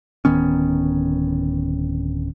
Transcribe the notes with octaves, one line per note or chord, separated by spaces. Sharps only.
D1 D#3 B3 C#4